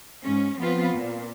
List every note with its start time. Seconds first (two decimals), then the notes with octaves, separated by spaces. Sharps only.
0.22 G#2 C#4
0.58 F3 B3 C4 F4 B4
0.93 A#2